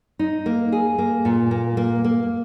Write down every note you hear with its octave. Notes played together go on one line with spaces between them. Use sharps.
D#4
A#3
G#4
A#3
A#2
A#3
A#3
A#3